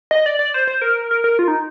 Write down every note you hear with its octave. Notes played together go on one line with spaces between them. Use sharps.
D#5
D5
D5
C5
C5
A#4
A#4
A#4
F4
D#4